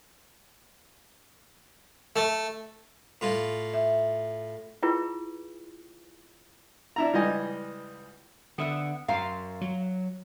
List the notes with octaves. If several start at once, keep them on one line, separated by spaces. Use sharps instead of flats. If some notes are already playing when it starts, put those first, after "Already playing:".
A3
A2 F4
E5
E4 F4 G#4 B4
D4 E4 A#5
C#2 E3 G3 D#5 G#5
D3 B3 E5 F#5
F#2 F5 A#5 C6
F#3